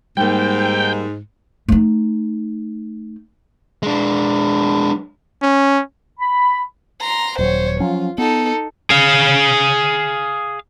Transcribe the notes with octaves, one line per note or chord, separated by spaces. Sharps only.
G#2 G3 A#3 G5
A3 D#4
G#3 D4
C#4
B5
A#5 C6
D#1 F#3 C5 C#5
F3 F#3 C#4 F4
B3 D#4 A4
G#4 F5